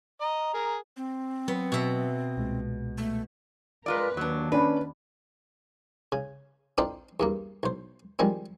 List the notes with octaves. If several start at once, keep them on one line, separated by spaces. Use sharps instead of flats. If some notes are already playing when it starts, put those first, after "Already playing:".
D#5 A#5
G#4 A#4
C4
F#3 B3
B2 E5
C2 A#2 G#3
A3
G#3 F4 A#4 B4 D5
D#2 F#3 D4
C#4 D4 B4
C#3
C4 D4 D#4 F4 A4 C5
E2 G2 A#3
B1 C5
D#3 F3 G3 G#3 C4